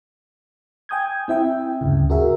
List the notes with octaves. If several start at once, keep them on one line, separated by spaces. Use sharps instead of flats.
G5 G#5 D#6 G6 G#6
C4 E4 E5 G5
D2 G2 C#3
F#4 G#4 A#4 E5